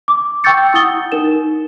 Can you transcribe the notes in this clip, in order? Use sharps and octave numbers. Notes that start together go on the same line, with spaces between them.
D6
G5 C#6 E6 G6 A6 C#7
E4 F#5 D#6 A6 G7
D#4 A#4 E7